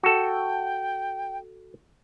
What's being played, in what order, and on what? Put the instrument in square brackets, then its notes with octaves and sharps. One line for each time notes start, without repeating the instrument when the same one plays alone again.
[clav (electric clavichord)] F#4 A4 [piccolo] G5